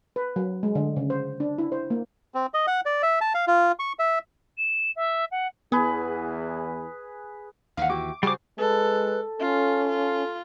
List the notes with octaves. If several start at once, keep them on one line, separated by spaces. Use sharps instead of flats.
B4
F#3
G#3
D3
C#3
C5
D4
E4
C5
A#3
C4
D#5
F#5
D5
E5
A5
F5
F4
C#6
E5
E7
E5
F#5
E2 B3 G#4 B4
D#2 E3 D#4 F5 F#5
E4 F#4 G4 D6
C#3 G3 F#4 G#4 C5 D6
G#3 A4 B4
C#4 F4 A4
F4